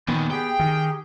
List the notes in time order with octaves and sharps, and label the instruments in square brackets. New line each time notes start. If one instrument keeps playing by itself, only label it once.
[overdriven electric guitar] A#2 D#3 [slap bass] B3
[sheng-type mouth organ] G4 G#4 [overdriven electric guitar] G5
[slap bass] D#3